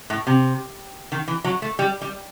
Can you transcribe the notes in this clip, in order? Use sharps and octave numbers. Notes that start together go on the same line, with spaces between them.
A2
C3
D#3
E3
F#3
A3
G3
G3